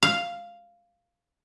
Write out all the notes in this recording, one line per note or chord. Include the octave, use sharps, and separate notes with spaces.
F5